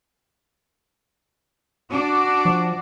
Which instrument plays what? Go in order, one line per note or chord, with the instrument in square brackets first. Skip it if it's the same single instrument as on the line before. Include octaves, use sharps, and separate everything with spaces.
[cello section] D4 F#4 D5
[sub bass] F3